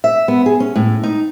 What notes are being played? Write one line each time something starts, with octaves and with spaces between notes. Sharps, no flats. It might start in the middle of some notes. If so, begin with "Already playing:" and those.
E5
B3
G#4
C#4
A2
D#4